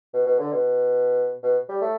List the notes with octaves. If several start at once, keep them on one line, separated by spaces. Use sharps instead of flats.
B2
B2
D3
B2
B2
G3
A3